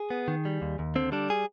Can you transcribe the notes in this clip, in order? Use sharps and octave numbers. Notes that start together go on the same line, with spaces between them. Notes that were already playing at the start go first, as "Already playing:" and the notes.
Already playing: G#4
B3
D#3
G3
D#2
D#2
D3 C4
G3 D4
G#4